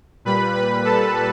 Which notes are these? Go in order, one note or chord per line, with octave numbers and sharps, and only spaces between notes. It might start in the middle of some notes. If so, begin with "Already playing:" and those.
A#2 G3 B4 B5
B4 B5
A4 A5